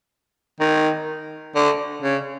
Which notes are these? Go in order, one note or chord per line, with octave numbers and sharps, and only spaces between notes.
D#3
D3
C#3